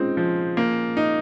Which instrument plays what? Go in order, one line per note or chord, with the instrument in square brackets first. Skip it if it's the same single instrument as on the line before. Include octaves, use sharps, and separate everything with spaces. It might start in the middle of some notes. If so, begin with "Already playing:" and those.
Already playing: [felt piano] G#3 C#4 F4 [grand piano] C4 D#4
[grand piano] F3
A#3
D#4